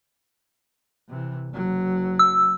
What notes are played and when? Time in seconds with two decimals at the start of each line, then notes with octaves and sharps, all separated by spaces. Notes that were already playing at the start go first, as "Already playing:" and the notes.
1.08 C3 E3
1.50 F#1 F#3
2.19 E6